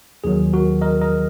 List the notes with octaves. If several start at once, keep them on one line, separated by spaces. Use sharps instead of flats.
D#2 D#3 F#3 G#4
F#4 A#4
A#4 D#5
A#4 D#5